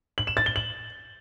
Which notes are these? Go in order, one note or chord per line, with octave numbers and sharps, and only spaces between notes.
F#7
E7
A6
G7
F#7